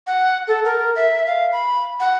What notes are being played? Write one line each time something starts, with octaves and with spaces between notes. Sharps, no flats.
F#5
A4
A#4
E5
F5
B5
F#5